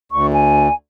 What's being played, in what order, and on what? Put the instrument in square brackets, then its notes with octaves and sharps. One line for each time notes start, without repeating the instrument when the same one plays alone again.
[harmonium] D2 [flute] C#6
[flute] G#5